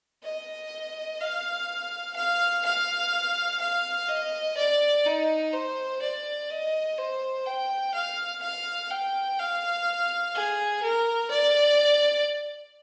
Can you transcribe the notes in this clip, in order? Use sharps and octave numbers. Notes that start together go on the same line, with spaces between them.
D#5
F5
F5
F5
F5
D#5
D5
D#4
C5
D5
D#5
C5
G5
F5
F5
G5
F5
G#4
A#4
D5